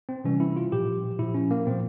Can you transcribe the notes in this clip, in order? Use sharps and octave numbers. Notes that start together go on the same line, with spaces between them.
C4
C3 E3 G3 C#4
E4
F4
A#2 F3 G4
A#2 F3 E4
C#4
A#3
A#2 F3 C4